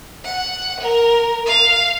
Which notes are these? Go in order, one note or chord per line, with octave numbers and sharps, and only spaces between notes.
F#5
A#4
F5